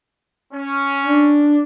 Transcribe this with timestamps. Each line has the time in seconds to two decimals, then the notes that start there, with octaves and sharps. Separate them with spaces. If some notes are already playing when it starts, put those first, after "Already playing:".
0.54 C#4
1.04 D4